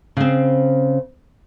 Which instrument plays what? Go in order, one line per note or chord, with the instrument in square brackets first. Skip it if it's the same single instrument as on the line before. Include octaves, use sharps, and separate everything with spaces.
[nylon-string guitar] C#3 C4